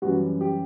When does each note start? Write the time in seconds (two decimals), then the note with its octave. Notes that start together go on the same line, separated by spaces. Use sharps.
0.02 F#2 E3 G3 F#4
0.41 G4